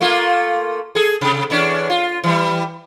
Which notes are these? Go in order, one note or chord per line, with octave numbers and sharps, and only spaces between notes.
A3 A#3 F4
G#4 A4
C3
E2 C#4 D4
F4
E3 G3